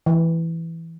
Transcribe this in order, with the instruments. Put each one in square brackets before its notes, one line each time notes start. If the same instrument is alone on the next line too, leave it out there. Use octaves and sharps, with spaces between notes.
[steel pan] E3